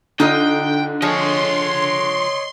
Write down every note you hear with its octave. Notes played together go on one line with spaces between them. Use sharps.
D3 D#4 F4 D#5 G5
F3 G#4 C#5 D#5 C6